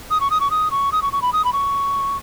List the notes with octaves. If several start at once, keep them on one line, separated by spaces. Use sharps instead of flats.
D#6
C#6
D#6
C#6
D#6
C#6
D#6
C#6
C#6
B5
D#6
B5
C#6